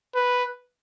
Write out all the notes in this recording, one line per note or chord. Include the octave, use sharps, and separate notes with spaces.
B4